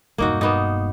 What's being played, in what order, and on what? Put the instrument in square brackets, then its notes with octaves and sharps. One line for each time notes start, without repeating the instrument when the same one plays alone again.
[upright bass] E1 G2 [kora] A#3 D#4 F#4
[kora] A#3 B3 D#4